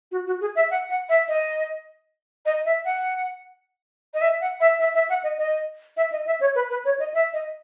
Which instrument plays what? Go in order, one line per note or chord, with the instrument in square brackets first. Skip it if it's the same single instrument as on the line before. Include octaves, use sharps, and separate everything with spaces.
[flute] F#4
F#4
G#4
E5
F#5
F#5
E5
D#5
D#5
E5
F#5
D#5
E5
F#5
E5
E5
E5
F#5
D#5
D#5
E5
D#5
E5
C#5
B4
B4
C#5
D#5
E5
D#5